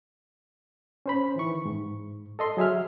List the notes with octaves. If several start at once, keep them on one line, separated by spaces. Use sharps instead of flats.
C#4 C5 B5
D#3 E3 C#6
G#2
A4 D#5 C6
F#3 G#4 E5 F6